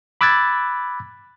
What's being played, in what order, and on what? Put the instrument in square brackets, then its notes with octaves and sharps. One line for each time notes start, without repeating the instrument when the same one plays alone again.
[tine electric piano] B5 D6 E6 F#6 G#6 A6